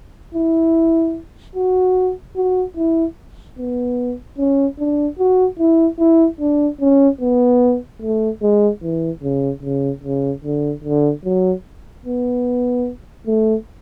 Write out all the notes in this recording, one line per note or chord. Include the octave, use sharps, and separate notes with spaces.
E4
F#4
F#4
E4
B3
C#4
D4
F#4
E4
E4
D4
C#4
B3
A3
G#3
E3
C#3
C#3
C#3
D3
D3
F#3
B3
A3